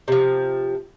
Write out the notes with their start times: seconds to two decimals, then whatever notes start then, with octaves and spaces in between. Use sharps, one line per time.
0.08 C3 F3